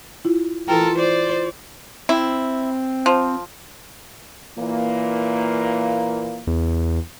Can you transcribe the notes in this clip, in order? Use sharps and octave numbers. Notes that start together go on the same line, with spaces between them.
E4 F4
E3 F4 A4 A#4 G5
C5 D5
C4 E4
F3
A#2 E3 A#3
E2